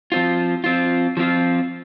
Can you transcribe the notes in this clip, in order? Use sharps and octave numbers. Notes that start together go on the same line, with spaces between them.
F3 C4 F4
F3 C4 F4
F3 C4 F4